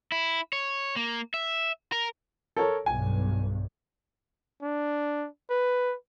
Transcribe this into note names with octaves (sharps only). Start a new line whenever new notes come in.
E4
C#5
A#3
E5
A#4
A4 A#4 C#5
B1 G2 G#5
D4
B4